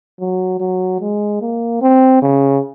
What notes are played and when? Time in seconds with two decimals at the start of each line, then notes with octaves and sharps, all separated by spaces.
0.20 F#3
0.60 F#3
1.01 G#3
1.41 A#3
1.82 C4
2.22 C#3